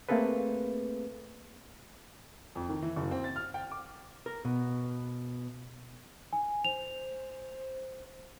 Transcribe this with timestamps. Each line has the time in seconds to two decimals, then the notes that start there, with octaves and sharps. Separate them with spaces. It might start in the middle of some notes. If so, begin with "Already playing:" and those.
0.09 A3 A#3 C4 G#4 A4 B4
2.55 F2
2.69 D#3
2.82 E3
2.96 F#1
3.11 C4
3.24 A6
3.36 F6
3.54 G5
3.72 D6
4.26 A#4
4.45 B2
6.33 G#5
6.65 C5 F7